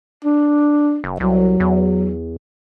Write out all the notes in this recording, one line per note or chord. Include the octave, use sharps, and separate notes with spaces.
D4
F#1
C2 F#3
E2